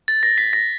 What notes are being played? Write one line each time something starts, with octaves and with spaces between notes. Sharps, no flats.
A6
A#6
B6
A#6